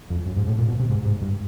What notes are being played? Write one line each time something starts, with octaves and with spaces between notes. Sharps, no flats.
F2
F#2
G#2
A2
A#2
B2
C3
G#2
G#2
G2